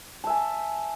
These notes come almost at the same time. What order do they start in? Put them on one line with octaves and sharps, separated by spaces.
A5 E5 G#5